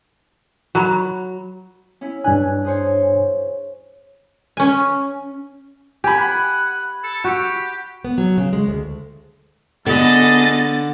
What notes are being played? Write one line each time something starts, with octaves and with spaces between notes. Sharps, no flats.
F#3 F#4 A#5 B5
C#4 E4
G2 D4 G#5 F#6
G#4 C5 C#5
C#4 G#5
G4 G#5 B5
F#5
A4
F#4 G4
B3
F#3
C#3
G#3
D2
D3 B3 G#4 A4 D#5 A6